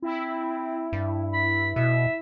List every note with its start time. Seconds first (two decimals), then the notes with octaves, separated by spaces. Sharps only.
0.02 C4 E4
0.93 G2
1.33 B5
1.76 B2 E5